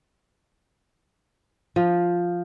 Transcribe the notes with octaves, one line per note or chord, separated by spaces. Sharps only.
F3